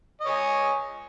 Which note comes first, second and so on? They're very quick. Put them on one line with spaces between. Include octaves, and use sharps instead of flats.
D#5 C#5 G#5